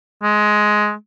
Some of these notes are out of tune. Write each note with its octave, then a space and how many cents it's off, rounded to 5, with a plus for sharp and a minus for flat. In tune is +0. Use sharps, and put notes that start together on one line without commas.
G#3 +15